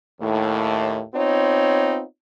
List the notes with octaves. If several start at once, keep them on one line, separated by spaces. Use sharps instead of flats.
D#2 A2
B3 C4 D#4 F4 C#5